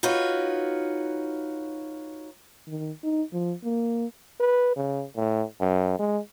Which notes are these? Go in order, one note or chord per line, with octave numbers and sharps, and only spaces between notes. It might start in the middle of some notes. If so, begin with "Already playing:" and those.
D#4 F4 F#4 B4 C#5
D#3
D#4
F3
A#3
B4
C#3
A2
F#2
G#3